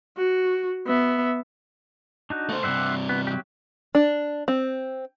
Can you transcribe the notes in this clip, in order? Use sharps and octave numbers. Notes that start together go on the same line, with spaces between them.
F#4
B3 E5
D4 D#4 F#4
A3 C5
G2 C3 C5 E5 F#5
B3
F#3 G4
D4
C4